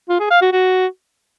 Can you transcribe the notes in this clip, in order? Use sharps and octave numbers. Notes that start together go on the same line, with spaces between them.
F4
G#4
F5
F#4
F#4